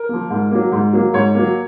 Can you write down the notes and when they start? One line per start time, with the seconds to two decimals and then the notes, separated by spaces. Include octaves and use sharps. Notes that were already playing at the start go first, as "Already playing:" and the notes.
Already playing: A#4
0.09 F3 A#3
0.30 G#2
0.51 F#3 A#3
0.72 G#2
0.93 F#3 A#3
1.13 G#2 C#5
1.35 F#3 A#3